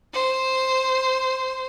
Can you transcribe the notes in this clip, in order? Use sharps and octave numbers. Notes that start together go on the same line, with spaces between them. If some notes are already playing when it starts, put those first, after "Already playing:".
C5